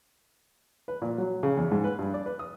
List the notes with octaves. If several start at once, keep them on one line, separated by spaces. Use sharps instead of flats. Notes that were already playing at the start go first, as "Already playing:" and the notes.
B4
A#2
F#3
C#3
E2
G#2
B4
G2
D5
B4
D#6